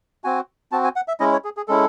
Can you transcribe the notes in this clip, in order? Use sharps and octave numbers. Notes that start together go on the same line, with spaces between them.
C4 F#4 G#5
C4 F#4 A5
G#5
F#5
E5
G#3 C#4 E4 D#5
C#5
G#4
G#4
G#3 C#4 E4 A4